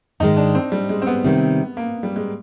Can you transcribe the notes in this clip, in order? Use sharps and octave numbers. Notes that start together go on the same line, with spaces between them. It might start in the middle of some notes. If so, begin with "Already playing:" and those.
G#2 D#3 G#3 D#4
D4
C4
G3
G#3
C4
B3
C3 D#3 G3 C4
A#3
G3
G#3